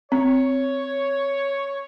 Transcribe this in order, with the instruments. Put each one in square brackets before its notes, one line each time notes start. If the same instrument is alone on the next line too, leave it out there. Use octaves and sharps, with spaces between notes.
[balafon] C4 [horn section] C#5